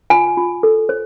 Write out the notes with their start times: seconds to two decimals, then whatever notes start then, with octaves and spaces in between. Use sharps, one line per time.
0.10 F4 G#5
0.37 F4
0.63 A4
0.89 C5